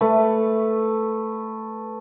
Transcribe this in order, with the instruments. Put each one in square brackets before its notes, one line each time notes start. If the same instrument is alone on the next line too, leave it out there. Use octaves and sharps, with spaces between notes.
[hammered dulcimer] A3 B4